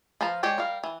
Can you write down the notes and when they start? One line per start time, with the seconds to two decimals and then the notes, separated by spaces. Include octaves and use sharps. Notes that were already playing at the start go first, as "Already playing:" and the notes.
0.21 F3 B4 F5 A5 A#5
0.43 G#3 G4 C#5 D5 G5
0.58 G3 A#4 F5
0.84 E3